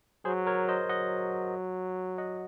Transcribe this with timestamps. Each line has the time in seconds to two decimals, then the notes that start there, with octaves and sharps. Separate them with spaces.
0.25 F#3 G#4 C5
0.47 A#4 C#5
0.68 C5 D#5
0.89 F#3 D#5 F#5
2.18 D#5 F#5